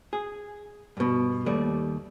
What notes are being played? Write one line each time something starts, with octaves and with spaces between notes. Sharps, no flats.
G#4
G2 B2
D#2 G3 A3 D5